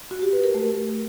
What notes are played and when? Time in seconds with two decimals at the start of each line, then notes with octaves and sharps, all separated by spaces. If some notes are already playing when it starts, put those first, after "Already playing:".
0.11 F#4
0.22 G4
0.33 B4
0.44 A#4
0.55 A3